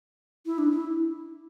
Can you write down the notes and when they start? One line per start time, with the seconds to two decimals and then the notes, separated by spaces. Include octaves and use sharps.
0.46 E4
0.58 D4
0.71 E4